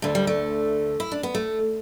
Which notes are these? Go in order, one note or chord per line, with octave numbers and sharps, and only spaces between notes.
D2 D3 A3
G3
A3
E4
D4
B3
A3